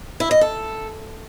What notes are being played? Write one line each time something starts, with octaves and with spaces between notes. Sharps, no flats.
E4
D#5
A4